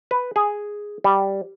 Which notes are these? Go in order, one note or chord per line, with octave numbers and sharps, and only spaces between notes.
B4
G#4
G3